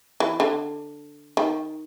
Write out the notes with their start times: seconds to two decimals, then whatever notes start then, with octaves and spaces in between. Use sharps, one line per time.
0.20 E3
0.40 D3
1.37 D#3